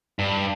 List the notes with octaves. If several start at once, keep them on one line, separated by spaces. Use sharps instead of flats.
G2